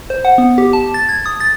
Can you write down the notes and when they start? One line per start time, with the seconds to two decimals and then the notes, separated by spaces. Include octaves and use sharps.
0.10 C5
0.25 F#5
0.38 B3
0.58 G4
0.73 A5
0.94 A6
1.09 G#6
1.26 D#6
1.40 A6